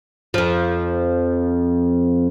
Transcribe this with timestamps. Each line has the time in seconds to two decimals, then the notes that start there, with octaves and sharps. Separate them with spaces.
0.34 F2 F3